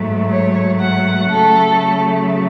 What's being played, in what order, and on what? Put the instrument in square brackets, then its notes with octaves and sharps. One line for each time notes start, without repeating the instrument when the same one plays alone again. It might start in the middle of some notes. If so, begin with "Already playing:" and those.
Already playing: [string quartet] G#2 F#3 A3
C#5
F#5
C#3 F#3 A3 A4